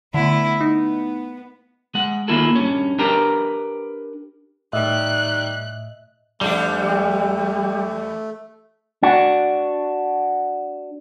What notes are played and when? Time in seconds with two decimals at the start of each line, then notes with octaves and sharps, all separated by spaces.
0.14 D3 A3 B3 E4
0.61 B3 D#4
1.95 G#3 F#5
2.28 D#3 A#3 E4 F4 G#4 A4
2.55 G2 C#4
2.99 D4 G4 A#4 B4 G5 A#5
4.73 A2 D#3 G3 D#5 E5 F#6
6.41 E2 G3 A3 D4 G4
9.03 D4 F#4